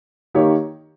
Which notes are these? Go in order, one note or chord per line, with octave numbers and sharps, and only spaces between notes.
D#3 A#3 D#4 G4 C#5